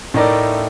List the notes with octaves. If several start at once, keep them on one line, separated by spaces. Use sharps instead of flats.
A2 A3 D#4 A#4 D5